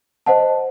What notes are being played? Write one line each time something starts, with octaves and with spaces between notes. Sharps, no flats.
C5 D#5 F#5 A5